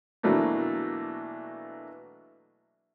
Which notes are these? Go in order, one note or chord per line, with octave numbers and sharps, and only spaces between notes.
B2 E3 F#3 A3 A#3 D4